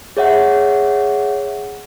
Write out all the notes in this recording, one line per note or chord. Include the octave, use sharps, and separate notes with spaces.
G#4 C#5 E5 F#5